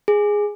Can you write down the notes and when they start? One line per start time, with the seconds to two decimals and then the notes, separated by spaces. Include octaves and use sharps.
0.08 G#4